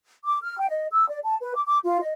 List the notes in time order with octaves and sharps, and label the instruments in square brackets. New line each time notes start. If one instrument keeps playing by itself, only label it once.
[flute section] D6
F6
G5
D#5
E6
D5
A5
B4
D6
D6
F4
D#5